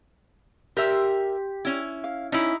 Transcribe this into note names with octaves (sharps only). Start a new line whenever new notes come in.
G4 A#4 E5 C6
C#4 E4
F5
C#4 D#4 E4